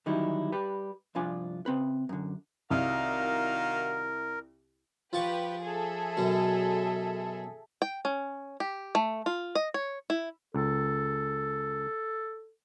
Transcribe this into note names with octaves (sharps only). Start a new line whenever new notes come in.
D2 D#3 F#3 G3 D#4 E4
G3 G4 B4
C2 G2 F3 D4 F4 G#5
C#3 C4 B4
F#2 D3
C2 D#3 F#4 A#4 F5
F3 G4 B4 A5 C#6
G#4 A4 E5
F#2 B2
G5
C#4
G4
A3
F4
D#5
C#5
E4
C#2 A4